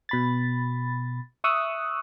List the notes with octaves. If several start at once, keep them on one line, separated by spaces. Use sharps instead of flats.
B2 B5 A6
E5 C#6 D#6 E6 F#6